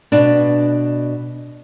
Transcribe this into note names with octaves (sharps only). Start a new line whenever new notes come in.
B2 D4